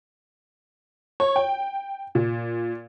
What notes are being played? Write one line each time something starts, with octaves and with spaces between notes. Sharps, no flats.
C#5
G5
A#2